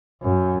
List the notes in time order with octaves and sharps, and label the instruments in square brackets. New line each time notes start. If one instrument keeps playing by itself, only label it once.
[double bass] F#2